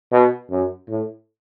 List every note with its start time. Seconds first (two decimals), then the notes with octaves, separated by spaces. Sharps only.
0.12 B2
0.51 F#2
0.89 A2